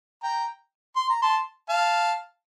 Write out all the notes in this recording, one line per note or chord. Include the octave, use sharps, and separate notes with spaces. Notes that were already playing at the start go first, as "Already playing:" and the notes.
G5 A#5
C6
A#5
A5 C6
F5 A5